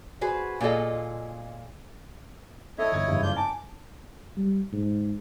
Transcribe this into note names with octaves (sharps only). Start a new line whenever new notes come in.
F#4 G#4 B4 C5
A#2 F4 G#4 A4 D#5
E4 A4 C#5 D#5 E5
G1 G#6
F#1 G2
D4 F4 G6
G#5 A5 D6
G3
G#2